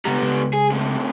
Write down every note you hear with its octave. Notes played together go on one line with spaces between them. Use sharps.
C#3 G3 G#3 B3 A#5
C#3 G#3
G#4
A2 C3